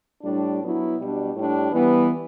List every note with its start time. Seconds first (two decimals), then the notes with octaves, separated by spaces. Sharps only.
0.23 A2 G3 D4
0.60 F#3 B3 E4
0.97 B2 G3 D4
1.35 A2 G3 D4
1.72 E3 G3 B3